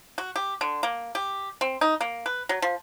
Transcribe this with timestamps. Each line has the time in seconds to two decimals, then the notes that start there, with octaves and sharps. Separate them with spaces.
0.18 F#4
0.36 G4
0.61 D3
0.83 A#3
1.15 G4
1.61 C4
1.81 D#4
2.01 A#3
2.26 B4
2.49 F#3
2.62 F3